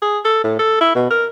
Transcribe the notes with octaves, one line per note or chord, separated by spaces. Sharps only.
G#4
A4
A2
A4
E4
B2
A#4